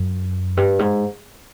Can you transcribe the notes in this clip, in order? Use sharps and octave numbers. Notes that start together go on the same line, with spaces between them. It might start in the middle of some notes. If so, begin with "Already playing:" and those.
Already playing: F#2
G2
G#2